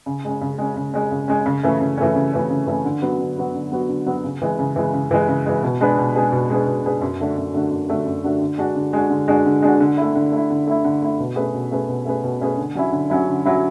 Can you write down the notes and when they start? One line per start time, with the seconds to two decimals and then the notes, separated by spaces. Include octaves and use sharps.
0.06 C#3
0.25 G#3 C#4
0.41 C#3
0.58 G#3 C#4
0.76 C#3
0.94 G#3 C#4
1.11 C#3
1.28 G#3 C#4
1.46 C#3
1.63 E3 A3 C#4
1.81 C#3
1.97 E3 A3 C#4
2.15 C#3
2.33 E3 A3 C#4
2.50 C#3
2.67 E3 A3 C#4
2.85 D3
3.02 F#3 B3 F#4
3.20 D3
3.38 F#3 B3 F#4
3.55 D3
3.72 F#3 B3 F#4
3.89 D3
4.06 F#3 B3 F#4
4.24 C#3
4.42 E3 G#3
4.59 C#3
4.76 E3 G#3
4.93 C#3
5.11 E3 G#3
5.28 C#3
5.46 E3 G#3
5.63 B2
5.81 G#3 D4 G#4 B4
5.98 B2
6.16 G#3 D4 G#4 B4
6.32 B2
6.50 G#3 D4 G#4 B4
6.67 B2
6.84 G#3 D4 G#4 B4
7.01 F#2
7.19 D3 A3 D4 F#4
7.37 F#2
7.53 D3 A3 D4 F#4
7.71 F#2
7.88 D3 A3 D4 F#4
8.06 F#2
8.24 D3 A3 D4 F#4
8.41 D3
8.58 G#3 D4 F#4
8.76 D3
8.93 G#3 D4 F#4
9.10 D3
9.28 G#3 D4 F#4
9.46 D3
9.62 G#3 D4 F#4
9.80 D3
9.97 A3 E4
10.15 D3
10.32 A3 E4
10.50 D3
10.67 A3 E4
10.84 D3
11.02 A3 E4
11.20 B2
11.36 A3 C#4 G#4 B4
11.54 B2
11.71 A3 C#4 G#4 B4
11.88 B2
12.05 A3 C#4 G#4 B4
12.24 B2
12.41 A3 C#4 G#4 B4
12.57 D3
12.75 F#3 C#4 E4
12.92 D3
13.10 F#3 C#4 E4
13.27 D3
13.45 F#3 C#4 E4